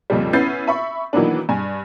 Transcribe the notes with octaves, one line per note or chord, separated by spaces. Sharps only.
F2 A#2 C#3 F3 G3
B3 C#4 E4 G6 A6 C7
E5 B5 C#6
D#3 E3 F#3 A#3 B3 D4
G2 G#5